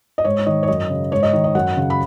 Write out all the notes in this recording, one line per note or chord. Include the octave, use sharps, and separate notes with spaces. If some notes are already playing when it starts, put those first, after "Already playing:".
D#5
G#2 C#5
D#3 D#5
C#5
F#2 D#5
C#3
G#2 C#5
D#5
D#3
D#5
F#2 F#5
C#3
B5